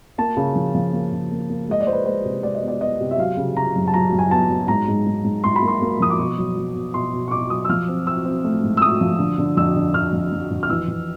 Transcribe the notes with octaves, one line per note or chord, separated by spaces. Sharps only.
A#3 A5
C#3
F3
F3
A#3
C#3
A#3
A#3
G#3 D#5
D5
G#3 C5
B4
G#3 C5
C3
G#3 D5
D#5
B3
D5
B3 D#5
C3
E5
F#3 F5
C#3
C#3 A#5
F#2
A5
F#3 A#5
F#2
G#5
B3 A5
F#3
G#2 A#5
G#2
G#2
G#2
G#2 C6
B5
A#3
C6
A#3
F3 D#6
D6
B2 C#6
F#3
F#3
B2
B2 C6
B2
C#6
B2 D6
F#3 D#6
E6
F3 F6
C4
C4 E6
C4
A3
G#2
E6
A3 D#6
F3
D3
D3
F2 E6
D3
D3 F6
F2
F3
F2
F6
E3 E6
E3